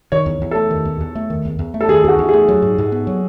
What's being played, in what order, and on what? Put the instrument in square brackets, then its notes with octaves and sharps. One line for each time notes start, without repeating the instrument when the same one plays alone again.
[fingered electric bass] D#3 [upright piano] C#5
[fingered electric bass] E2
E2
[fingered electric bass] A3 [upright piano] A4
[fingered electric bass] D#3
E2
E2
A3
D#3
E2
E2
A3
[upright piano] A4
[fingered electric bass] D#3 [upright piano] G#4
[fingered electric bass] E2 [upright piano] F#4 G#4
[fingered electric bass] E2
[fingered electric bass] A3 [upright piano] G#4
[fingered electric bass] F#3
G#2
G#2
B3
F#3